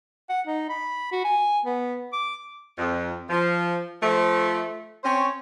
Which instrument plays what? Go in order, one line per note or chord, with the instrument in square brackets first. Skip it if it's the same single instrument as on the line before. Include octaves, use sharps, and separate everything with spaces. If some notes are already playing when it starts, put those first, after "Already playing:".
[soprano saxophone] F#5
D#4
B5
F#4
G#5
B3
D6
[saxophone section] F2
F3
F3 A3
C4 C#4 C5 C#5